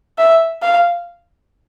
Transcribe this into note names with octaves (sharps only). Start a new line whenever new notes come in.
E5
F5